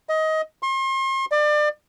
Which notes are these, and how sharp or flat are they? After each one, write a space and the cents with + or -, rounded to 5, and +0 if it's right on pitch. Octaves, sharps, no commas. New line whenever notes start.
D#5 +20
C6 +40
D5 +30